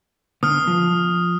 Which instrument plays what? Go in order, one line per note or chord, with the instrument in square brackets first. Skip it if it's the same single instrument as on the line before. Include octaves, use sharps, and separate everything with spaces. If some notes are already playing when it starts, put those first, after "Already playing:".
[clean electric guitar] D3 B3 [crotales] D#6 F6
[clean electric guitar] F3